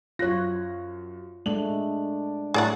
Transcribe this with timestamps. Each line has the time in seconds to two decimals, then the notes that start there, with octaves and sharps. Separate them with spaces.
0.19 F#2 F4 C#5 F#6 A#6
1.46 G#3 A3 D4 F#7
2.54 A2 F#3 G#4 A4 D5 E5 F#5